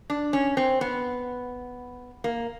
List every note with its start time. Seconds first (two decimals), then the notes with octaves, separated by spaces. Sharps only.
0.10 D4
0.33 C#4
0.57 C4
0.81 B3
2.24 A#3